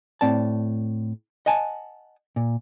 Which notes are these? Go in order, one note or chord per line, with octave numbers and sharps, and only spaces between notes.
A2 C4 D5 A5
D#5 F#5 G#5 A5
A#2